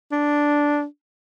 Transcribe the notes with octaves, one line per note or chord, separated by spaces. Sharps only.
D4